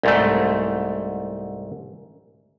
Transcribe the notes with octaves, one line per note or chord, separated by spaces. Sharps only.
C2 G#2 A3